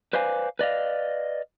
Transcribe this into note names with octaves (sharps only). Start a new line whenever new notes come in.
B4 C5 D5 F5 G#5
B4 D5 D#5 F5